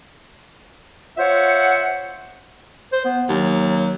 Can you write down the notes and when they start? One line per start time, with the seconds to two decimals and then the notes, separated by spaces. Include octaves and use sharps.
1.18 F4 C5 C#5 E5 F#5
2.92 C5
3.05 B3
3.29 D#2 F#3